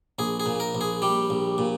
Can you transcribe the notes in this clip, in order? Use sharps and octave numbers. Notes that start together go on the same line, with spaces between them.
A#1 G#4
G#4
A#2
A#4
A#1
G#4
G3 G4
A#1
A#2